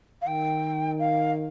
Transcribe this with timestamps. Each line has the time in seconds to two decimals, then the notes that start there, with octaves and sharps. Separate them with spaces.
0.22 F5
0.27 D#3 G5
0.99 F5